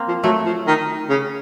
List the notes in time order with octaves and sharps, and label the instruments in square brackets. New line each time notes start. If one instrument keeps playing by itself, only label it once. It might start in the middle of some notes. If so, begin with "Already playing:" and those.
Already playing: [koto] A#3 C4
[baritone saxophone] F3
[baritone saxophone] F#3 [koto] A3
[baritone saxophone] F3
D#3
C#3